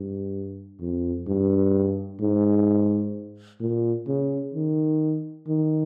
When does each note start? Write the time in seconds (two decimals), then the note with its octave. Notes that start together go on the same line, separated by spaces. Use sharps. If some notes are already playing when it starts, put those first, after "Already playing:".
Already playing: G2
0.80 F2
1.27 G2
2.20 G#2
3.61 A#2
4.07 C#3
4.54 D#3
5.48 D#3